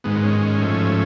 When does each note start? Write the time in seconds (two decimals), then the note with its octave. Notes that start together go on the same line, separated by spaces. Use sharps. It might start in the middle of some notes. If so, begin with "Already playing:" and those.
0.04 G#2 D#3 G#3 B3
0.23 C#4
0.43 C#4
0.61 G#2 F3 A3